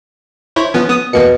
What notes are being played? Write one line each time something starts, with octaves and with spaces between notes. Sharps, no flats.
E4 C5 C#5
F3 B3 C#4
B3 D#6
E2 B2 A#3 C#7